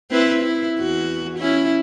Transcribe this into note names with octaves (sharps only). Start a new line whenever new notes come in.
C4 E4 B4
E4
E2 F#4
C#4 E4